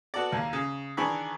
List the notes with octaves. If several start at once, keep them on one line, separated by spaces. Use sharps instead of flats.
B3 F#4 A4 D5
D#2 A#3
C#3
D#3 E3 D4 G#4 B5 C#6